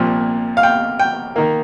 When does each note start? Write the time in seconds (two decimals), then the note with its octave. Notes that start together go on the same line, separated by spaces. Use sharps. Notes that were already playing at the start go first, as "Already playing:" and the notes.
Already playing: C2 A#2 F3
0.57 F5
0.63 G5
0.99 G5
1.36 D#3 A#3